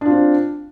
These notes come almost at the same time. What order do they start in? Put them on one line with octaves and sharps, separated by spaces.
D4 F4 C4